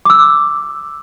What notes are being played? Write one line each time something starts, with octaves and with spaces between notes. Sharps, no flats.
D6 E6